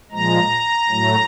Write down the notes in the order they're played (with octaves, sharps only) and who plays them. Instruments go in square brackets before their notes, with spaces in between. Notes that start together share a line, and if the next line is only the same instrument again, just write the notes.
[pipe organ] A#2 F3 G#3 A#5
A2 F#3 A3